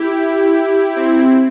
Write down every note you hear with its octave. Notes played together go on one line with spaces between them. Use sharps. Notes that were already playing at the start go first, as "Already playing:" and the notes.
Already playing: E4 G4
C4 E4